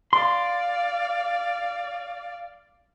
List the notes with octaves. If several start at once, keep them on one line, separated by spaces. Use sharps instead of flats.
D5 F5 C6